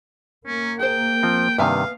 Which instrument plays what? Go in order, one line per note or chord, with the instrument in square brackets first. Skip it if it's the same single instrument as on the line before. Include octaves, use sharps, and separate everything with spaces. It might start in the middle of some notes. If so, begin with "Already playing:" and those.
[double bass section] A#3 [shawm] C#4
[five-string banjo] G#4 C5 [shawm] G5
[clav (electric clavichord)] F3 C4
[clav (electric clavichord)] G2 C3 D#3 [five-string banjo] B3 E5 G#5 [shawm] F5